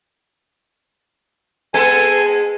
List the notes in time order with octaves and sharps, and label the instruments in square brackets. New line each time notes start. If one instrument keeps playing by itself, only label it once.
[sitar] G#3 B3 A4 [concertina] G#5